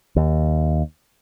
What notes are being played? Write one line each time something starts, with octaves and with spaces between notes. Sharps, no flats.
D#2